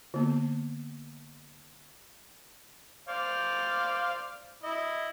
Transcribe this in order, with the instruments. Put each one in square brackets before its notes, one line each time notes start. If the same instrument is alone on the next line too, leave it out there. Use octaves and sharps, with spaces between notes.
[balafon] D3 A#3 B3
[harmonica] C5 D5 F5
E4 D#5